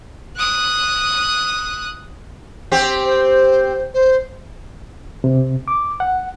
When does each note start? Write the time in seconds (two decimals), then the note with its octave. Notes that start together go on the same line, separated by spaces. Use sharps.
0.37 D#6 F#6
2.72 C4 G4
3.04 C5
3.94 C5
5.24 C3
5.68 D6
6.00 F#5